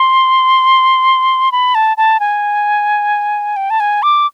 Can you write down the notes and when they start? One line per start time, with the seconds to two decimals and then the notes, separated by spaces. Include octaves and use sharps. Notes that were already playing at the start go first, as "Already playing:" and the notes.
Already playing: C6
1.52 B5
1.75 A5
1.97 A5
2.20 G#5
3.56 G5
3.70 A5
3.80 G#5
4.03 D6